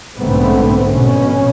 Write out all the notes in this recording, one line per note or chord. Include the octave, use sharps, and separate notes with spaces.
B1 G#2 D3 A3 B3 C4
A#1 B2 C#4